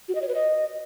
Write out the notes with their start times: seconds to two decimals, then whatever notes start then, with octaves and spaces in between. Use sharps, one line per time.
0.09 F#4
0.15 D#5
0.22 C#5
0.28 B4
0.35 D#5